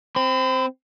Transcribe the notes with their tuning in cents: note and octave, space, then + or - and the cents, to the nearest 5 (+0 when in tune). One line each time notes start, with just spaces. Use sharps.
C4 +0 B5 +45